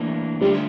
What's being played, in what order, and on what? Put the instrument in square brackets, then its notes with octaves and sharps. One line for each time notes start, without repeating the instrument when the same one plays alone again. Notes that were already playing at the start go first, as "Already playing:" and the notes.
Already playing: [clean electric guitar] E3 A#3 D4 [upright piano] A3
[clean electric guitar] D3 A3 D4 F4 [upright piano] G3